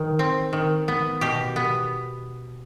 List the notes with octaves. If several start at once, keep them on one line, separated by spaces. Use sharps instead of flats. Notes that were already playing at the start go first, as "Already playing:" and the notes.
Already playing: D#3
C4
D#3
B3
B2 G4
B3